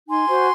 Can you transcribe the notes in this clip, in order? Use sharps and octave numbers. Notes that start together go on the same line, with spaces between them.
D#4 G#5 C6
F#4 C5